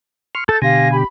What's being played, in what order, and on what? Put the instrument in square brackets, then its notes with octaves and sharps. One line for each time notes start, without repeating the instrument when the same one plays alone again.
[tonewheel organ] C6 C#6 F6
[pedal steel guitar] A4 [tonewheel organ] E6 [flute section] G6 [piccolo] A6
[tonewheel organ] B2 D3 [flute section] G4 F5 C6 [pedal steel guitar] G#5 [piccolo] A#6
[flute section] G4 [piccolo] B5